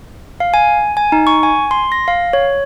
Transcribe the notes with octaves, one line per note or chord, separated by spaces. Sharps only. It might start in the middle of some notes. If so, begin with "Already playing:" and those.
F5
G#5
G#5
D#4
C#6
G#5
C6
A#6
F5
C#5